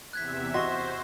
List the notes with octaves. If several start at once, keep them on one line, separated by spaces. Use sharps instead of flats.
E2 C3 E5 F#6 G#6 B6
F#4 C5 D#5 C6 C#6 A#6